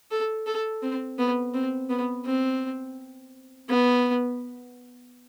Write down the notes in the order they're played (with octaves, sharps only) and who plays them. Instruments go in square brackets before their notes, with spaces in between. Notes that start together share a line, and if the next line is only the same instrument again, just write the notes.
[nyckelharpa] A4
A4
C4
B3
C4
B3
C4
B3